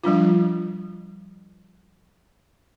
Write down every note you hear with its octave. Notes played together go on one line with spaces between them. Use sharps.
F3 G3 D4 F4